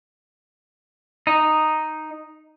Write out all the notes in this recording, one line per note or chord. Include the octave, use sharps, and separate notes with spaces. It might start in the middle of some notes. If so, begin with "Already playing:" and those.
D#4